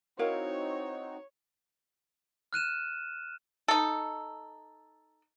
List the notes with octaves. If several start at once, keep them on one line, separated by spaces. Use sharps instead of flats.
C4 D#4 E4 F#4 A#4 C#5 F5
F6 F#6 D#7 E7
D#4 A4